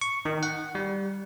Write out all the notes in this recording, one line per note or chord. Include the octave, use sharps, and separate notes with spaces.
C#6
D#3
F#5
G3